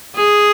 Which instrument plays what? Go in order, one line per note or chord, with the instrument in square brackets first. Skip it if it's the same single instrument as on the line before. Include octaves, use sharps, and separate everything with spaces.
[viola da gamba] G#4